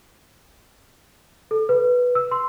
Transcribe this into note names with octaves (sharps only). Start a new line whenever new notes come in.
A4
B4
E6
C6